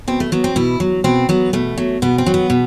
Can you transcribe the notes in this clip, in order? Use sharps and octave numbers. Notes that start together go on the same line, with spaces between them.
B2 C4
A3
F#3 B3
C4
B2 E4
F#3
B2 C4
F#3 B3
B2 A3
F#3
B2 B3
C4
F#3
B3
B2